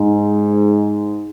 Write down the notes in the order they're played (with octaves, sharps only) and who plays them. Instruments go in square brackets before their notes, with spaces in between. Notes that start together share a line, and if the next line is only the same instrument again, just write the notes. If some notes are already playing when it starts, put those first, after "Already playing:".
Already playing: [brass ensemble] G#2